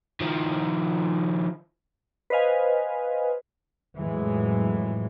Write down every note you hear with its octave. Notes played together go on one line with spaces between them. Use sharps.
D#3 F3
B4 C5 D#5 F5 G#5
F2 A2 E3 F#3 G#3